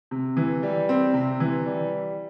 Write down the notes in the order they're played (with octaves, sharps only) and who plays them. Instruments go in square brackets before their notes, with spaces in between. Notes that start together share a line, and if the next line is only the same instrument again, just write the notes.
[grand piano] C3
E3
G3
C4
C3
E3
G3